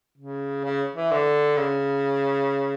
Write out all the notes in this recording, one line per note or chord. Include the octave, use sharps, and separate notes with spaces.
C#3
C#3
E3
D3
C#3